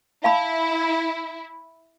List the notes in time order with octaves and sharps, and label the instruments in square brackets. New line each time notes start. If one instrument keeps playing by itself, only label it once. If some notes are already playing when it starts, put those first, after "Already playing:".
[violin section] E4 [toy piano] F5 A5 B5